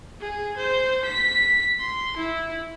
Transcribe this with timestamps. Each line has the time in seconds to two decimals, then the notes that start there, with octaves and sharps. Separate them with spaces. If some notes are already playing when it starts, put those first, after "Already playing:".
0.21 G#4
0.57 C5
1.05 B6
1.79 C6
2.17 E4